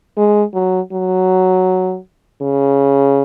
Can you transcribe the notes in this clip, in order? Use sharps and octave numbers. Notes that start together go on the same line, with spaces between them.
G#3
F#3
F#3
C#3